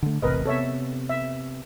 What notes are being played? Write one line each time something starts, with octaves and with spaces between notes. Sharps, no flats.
D3 A3
E1 A1 C3 A#4 B4 D#5
C3 B3 A4 C#5 E5
E5